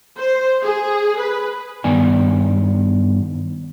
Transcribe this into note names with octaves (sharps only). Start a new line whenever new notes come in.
C5
G#4
B4
G2 D#3 B3 D5 G#5